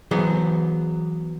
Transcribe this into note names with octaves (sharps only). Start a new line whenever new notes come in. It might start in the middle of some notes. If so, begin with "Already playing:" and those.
E3 F#3 B3 G#4 C5